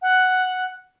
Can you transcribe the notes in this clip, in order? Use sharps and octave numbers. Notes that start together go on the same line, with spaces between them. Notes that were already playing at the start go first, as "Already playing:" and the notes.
F#5